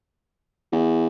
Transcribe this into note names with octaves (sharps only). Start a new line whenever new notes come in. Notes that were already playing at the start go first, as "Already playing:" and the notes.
E2